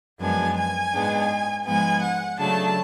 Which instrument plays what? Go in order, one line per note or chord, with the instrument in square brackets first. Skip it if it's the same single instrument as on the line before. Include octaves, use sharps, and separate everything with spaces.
[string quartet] F#2 F3 G#3 B3 D4 G#5
G#5
G#2 G#3 B3 D4
G#2 F3 G#3 B3 G#5
F#5
C#3 F#3 A3 D4 A5